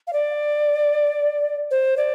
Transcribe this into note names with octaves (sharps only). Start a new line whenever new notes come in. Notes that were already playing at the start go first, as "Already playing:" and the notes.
F5
D5
C5
D5